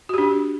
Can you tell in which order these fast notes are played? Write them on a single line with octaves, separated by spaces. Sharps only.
F#4 G4 D4